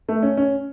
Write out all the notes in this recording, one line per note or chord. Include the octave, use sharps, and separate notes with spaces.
A3
C#4
C#4